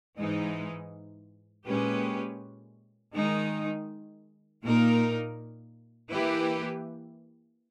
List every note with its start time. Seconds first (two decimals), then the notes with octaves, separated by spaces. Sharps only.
0.18 G#2 E3 G#3 D#4
1.66 A#2 G#3 C#4 G4 B4
3.14 D#3 G#3 D#4
4.62 A#2 A#3 D#4 A#4
6.11 E3 A#3 E4 G4 B4